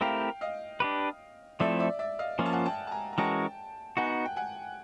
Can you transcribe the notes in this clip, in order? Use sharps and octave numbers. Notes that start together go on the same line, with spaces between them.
A3 C4 E4 G4 A#4 F5 G5
D#5 F5
D4 G4 B4
F3 A3 C4 E4 A4 D5 E5
D5 E5
D5 E5
D#5 F5
F3 A#3 C#4 F4 G#5
A5
F#5 G#5
G5 A5
A5
G#5 A#5
A#5
E3 G#3 C#4 F#4 A#4 G5 A5
B3 D#4 F#4 F#5 G#5
G5
F#5 G#5